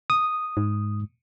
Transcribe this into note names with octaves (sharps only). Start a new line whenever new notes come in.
D#6
G#2